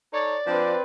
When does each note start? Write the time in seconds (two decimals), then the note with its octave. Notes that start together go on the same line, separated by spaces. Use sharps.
0.13 D#4 A4 C#5 D5
0.47 F3 C4 D4 B4